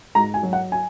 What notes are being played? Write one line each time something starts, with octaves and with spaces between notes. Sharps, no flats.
G#2 A#5
G#5
F#3
F#5
G#5